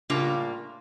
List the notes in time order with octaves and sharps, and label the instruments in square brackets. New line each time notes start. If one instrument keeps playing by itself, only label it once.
[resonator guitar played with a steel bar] A2 C#3 G3 A#3 D4 F4